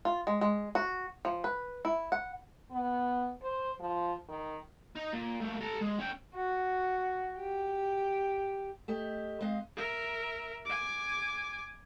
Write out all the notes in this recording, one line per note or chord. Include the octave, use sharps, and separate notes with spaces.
F4
G#3
G#3
F#4
F3
B4
E4
F#5
B3
C5
F3
D#3
D#4
A#2
A3 A#3
A4 A#5
G#3
C#4 G5
F#4
G4
A3 G4 D#5
G#3 C4 D#5 F5
A#4 E5
G#5 D6